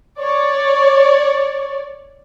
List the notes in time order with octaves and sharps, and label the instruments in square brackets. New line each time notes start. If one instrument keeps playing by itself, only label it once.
[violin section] C#5 D5